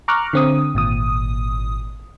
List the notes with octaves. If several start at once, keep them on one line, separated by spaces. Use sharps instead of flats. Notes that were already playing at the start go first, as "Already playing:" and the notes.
A#5 C#6 D6 F6 F#6
D3 C4 D#6
G#1 A#2 D#6